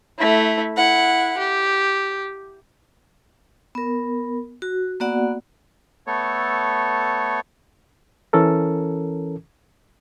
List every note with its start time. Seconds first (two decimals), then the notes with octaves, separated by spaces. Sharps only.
0.19 A3 E4
0.77 E4 F#5
1.38 G4
3.75 B3 A#4
4.62 F#4
5.00 A#3 B3 F#4 D5 F#5
6.07 A3 B3 A4 C#5
8.33 E3 C#4 A4 A#4